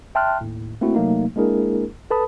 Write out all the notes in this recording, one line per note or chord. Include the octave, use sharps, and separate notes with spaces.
E5 G5 A5 C6 F6 F#6
D#2 A2
A3 A#3 C4 E4 F#4
C3 F#3 A3 A#3 D#4
G#3 A#3 D4 E4 G#4 A#4
A4 B4 A5 B5 D#6